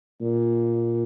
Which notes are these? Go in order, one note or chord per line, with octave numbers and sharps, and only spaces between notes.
A#2